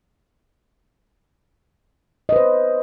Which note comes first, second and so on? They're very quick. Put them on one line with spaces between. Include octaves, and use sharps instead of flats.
D#5 B4 C5